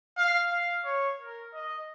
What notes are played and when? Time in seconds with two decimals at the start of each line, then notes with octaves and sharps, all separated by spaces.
0.17 F5
0.50 F5
0.85 C#5
1.20 A#4
1.54 D#5